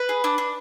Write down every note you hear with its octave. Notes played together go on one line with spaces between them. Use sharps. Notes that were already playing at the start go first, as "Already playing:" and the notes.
Already playing: B4
G#4
D4
D4